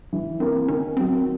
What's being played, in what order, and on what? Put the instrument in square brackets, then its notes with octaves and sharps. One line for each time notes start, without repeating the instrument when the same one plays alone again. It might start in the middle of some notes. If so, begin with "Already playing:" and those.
[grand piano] E3
[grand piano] A#3 [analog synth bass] C4
[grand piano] D#3 [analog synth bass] C#4
[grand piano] F#3 [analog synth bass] C4